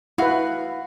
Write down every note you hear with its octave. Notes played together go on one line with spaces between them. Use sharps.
E4 F#4 B4 F5